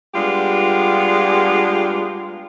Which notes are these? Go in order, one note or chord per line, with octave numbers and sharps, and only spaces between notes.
G3 G#3 B3 D4 F4 G4